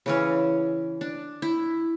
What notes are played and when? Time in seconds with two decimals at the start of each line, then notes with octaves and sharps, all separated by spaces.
0.06 C#3 E3 C#4
1.01 D4
1.42 E4